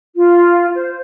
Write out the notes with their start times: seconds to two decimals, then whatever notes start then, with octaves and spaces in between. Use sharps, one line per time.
0.16 F4
0.75 C5